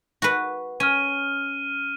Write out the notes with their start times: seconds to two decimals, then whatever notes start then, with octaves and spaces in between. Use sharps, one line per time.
0.22 F#4 B4
0.80 C#4 F6 D#7